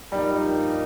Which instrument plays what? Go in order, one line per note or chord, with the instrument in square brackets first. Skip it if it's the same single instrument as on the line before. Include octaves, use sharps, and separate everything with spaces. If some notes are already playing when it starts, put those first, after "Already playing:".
[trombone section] G2 F3 A#3 D#4 [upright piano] G3